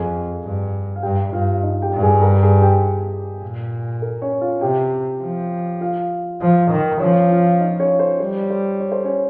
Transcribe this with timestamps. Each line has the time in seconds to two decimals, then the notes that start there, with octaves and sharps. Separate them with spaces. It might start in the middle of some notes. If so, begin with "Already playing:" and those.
Already playing: F2 G#4 G#5
0.44 G2
0.96 F5
1.03 G2 G4 G5
1.32 G2 F4 F5
1.63 D#4 D#5
1.82 G4 G5
1.93 G2
2.02 G#4 G#5
2.22 A#4 A#5
2.42 G#4 G#5
2.62 G4 G5
3.42 A#2
4.02 A#4
4.22 C#4 C#5
4.41 F4 F5
4.61 C3 G4 G5
5.21 F3
5.81 F4 F5
6.41 F3
6.71 D#3
7.00 F3 C#4 C#5
7.30 F4 F5
7.61 D#4 D#5
7.80 C#4 C#5
7.99 C5
8.20 G3 C5
8.42 C#5
8.50 C5
8.80 C#5
8.92 C5
9.04 C#4 C#5